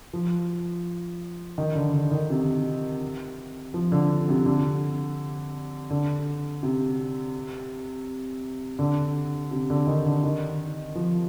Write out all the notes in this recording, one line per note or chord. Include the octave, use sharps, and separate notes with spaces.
F3
D#3
D3
D3
D#3
C3
F3
D3
C3
D3
D3
C3
D3
C3
D3
D#3
D3
D#3
F3